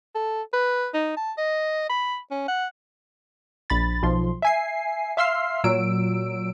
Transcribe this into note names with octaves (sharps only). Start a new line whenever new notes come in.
A4
B4
D#4
A5
D#5
B5
C#4
F#5
A#1 B5 A6
B1 F3 C6
E5 G#5 C7
E5 F5 C6 E6 F6 C7
A#2 F#3 E6 D7